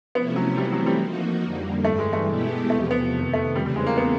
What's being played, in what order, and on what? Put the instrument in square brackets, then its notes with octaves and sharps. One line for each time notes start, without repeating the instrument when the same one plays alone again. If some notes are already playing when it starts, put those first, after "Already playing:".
[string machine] C3 F3 A3 C#4 E4 [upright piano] B3
[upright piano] F#3
[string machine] E3 A3 C4 [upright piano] G3
[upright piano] F#3
G3
[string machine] F3 A#3 D#4 F#4
F2 D3 G3 A#3
[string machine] G2 E3 G3 [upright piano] A3
[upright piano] G#3
A3
[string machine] B2 G#3 B3 E4 G4
[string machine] E2 C3 F3 [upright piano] A3
[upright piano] B3
[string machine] F2 C3 D#3
[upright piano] A3
[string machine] E2 C#3 E3 A3 C4 [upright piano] G3
[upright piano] G3
G#3
A#3
B3